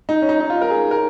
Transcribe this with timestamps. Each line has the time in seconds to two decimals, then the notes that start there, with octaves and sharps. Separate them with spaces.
0.09 D#4
0.22 C#4
0.29 D#4
0.40 D#4
0.50 F4
0.62 A#4
0.70 G#4
0.91 A#4